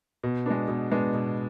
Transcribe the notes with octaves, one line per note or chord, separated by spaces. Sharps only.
B2
G#3 B3 D4
B2
G#3 B3 D4
B2